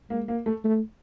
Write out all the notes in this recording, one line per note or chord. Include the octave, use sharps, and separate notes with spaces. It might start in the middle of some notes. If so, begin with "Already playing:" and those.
G#3 A#3
A#3
A3
A3